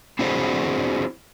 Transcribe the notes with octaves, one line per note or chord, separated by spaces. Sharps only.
C4 D4 E4 F#4 G#4 C5